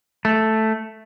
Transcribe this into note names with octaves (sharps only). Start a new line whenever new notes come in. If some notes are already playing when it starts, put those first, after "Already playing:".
A3